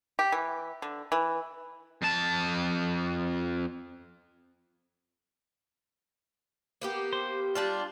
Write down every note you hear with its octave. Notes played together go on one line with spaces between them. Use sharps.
G4
E3
D3
E3
F2 A5
A#3 B3 G4
C5
G3 D4 F4 A5